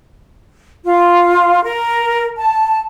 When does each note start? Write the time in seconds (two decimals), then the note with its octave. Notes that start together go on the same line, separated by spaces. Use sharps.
0.85 F4
1.63 A#4
2.37 A5